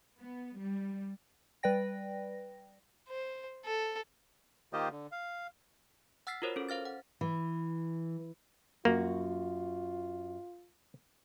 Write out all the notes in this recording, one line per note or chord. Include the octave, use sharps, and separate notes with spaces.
B3
G3
G3 B4 D5 G5 A#6
C5
A4
D#3 A#3 F4 G4 C5 D#5
D3
F5
F#5 E6 F6 A6 B6 C7
F4 F#4 A#4 C5 C#5
C#4 A4
C5 F5 F6 A6
F#5
E3
F#2 A#3 F4 F#4